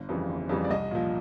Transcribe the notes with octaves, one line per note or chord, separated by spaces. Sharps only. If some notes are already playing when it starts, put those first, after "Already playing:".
Already playing: G1
F2 C#3 E3 G3
G1
F2 C#3 E3 G3
D5
C2 D#5
A#2 F3